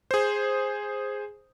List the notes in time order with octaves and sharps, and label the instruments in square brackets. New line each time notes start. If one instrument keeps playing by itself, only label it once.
[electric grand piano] G#4 C5